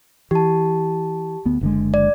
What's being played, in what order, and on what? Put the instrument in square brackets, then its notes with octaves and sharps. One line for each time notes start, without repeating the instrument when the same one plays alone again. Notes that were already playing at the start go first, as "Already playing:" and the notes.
[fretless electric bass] E3 [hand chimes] G4 A5
[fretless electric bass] D2 B3
F#1 D3 G#3
[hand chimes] D5